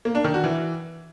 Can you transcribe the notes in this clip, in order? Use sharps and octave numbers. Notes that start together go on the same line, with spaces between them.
A#3
D4
D#3
F#4
E3